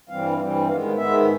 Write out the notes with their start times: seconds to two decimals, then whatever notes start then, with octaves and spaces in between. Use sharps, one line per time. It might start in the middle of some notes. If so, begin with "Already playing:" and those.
0.09 G2 E3 G3 C4 F5
0.38 G2 E3 G3 C4
0.67 G#2 D#3 G#3 B3 F5
0.97 G#2 D#3 G#3 B3 E5